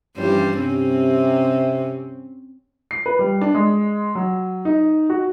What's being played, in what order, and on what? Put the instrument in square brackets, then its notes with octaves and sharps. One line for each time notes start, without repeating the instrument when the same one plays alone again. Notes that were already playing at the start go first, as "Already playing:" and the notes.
[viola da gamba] G2 G3 C5 [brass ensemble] E3 F3 C#4
[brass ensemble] C3 [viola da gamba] C4 C#4
[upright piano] C7
B4
G3
D4
G#3
F#3
D#4
F#4